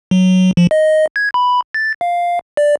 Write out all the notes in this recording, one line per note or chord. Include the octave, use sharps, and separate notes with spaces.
F#3
F3
D#5
G#6
B5
A6
F5
D5